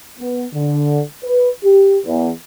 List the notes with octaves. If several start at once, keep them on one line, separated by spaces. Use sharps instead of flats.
B3
D3
B4
G4
E2